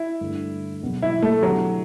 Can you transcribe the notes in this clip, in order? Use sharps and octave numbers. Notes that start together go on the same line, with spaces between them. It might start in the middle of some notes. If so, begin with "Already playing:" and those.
Already playing: E4
G2 D3 A3
E2 B2 F#3 B3
E4
A3
E2 D3 F#3 A3 E4 G4